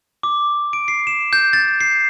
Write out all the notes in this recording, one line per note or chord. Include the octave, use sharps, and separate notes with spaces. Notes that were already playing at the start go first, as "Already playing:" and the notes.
D6
D7
C7
E7
G6
A6
C7